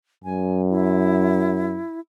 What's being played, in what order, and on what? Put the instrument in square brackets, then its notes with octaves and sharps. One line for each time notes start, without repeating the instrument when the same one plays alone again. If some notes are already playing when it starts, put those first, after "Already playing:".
[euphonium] F#2 [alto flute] G#5
[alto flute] E4